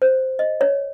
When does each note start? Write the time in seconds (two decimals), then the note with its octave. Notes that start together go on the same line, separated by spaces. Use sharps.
0.02 C5
0.39 D#5
0.61 C#5